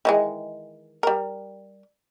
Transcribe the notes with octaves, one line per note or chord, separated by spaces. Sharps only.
D#3 E3 G#3
G3 A#4